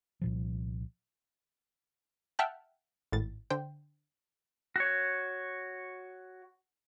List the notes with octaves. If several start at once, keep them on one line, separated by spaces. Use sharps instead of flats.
C2 A#2 F3
E5 F#5 G5 A5 F6 F#6
G#1 A2 A6
D3 C5 G5
F#4 C#5